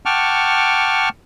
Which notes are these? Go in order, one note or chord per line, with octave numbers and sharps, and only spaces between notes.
F#5 G5 A5 C#6 D6 F6